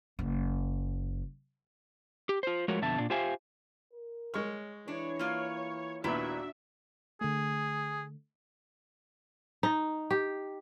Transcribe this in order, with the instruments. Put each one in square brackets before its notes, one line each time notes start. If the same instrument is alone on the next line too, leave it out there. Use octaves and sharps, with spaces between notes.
[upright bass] F#1 F#2
[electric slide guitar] G4
F4 C5
F3 G#3 A3 F#4 A#4 C#5
F2 B2 D3 E5 A5
A#2 D4
F4 G4 C5 E5 F5 G#5
[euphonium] A#4
[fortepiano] G#3 C#6 F6 [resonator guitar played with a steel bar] C#5
[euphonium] E3 [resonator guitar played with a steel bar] D4 [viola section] C#5
[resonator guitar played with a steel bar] A#3 F4 D5
[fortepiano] D#2 A#2 B3 [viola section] D4 F#4 E5 [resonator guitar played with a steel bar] E4 B4
[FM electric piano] D3 A3 [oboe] G#4
[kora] D#4
G4